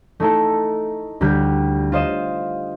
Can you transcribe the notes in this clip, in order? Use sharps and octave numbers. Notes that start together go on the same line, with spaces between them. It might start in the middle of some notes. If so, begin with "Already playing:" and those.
A3 D#4 E4 A4
D2 G3 G4 F#6
F4 C5 D#5 E7